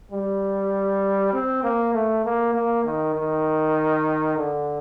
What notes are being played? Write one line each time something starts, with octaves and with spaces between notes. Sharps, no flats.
G3
C4
A#3
A3
A#3
A#3
D#3
D#3
D3